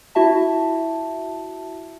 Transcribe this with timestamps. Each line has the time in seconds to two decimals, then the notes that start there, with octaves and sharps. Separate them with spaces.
0.15 E4 F#4 E5 A5